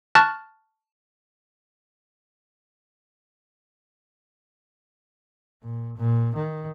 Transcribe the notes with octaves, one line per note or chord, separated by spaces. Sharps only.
A5 C#6 F6 F#6 A6
A#2
A#2
D#3